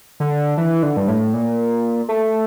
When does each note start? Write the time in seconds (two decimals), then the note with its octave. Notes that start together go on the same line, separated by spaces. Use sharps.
0.20 D3
0.57 E3
0.83 D3
0.97 G2
1.08 A2
1.33 A#2
2.09 A3